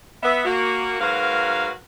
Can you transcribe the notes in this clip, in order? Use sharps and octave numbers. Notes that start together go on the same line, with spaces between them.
B3 E5
A#3 F#4
G#2 F#3 F#4 A#4 B4 F5